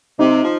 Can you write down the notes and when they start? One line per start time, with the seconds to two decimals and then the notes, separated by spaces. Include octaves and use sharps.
0.19 C3 D#4
0.43 F3